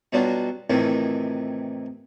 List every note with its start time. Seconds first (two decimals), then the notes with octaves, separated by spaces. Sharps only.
0.13 B2 F#3 G3 D4 F4 F#4
0.70 F2 A2 C3 D#3 E3